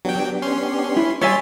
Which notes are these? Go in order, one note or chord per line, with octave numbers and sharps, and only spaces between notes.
F#3 B3 D4 G4 G5
C#4 C6
E4
G3 C#5 E5 G#5 C6 A6